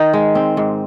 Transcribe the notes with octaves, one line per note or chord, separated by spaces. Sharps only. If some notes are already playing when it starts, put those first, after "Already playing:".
Already playing: D#3 D#4
G#3
C4
G#2